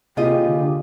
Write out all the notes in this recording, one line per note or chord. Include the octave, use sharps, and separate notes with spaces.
D#2 C3 F4 G4 G#4 D#5
D3